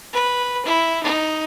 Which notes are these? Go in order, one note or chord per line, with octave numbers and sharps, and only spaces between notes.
B4
E4
D#4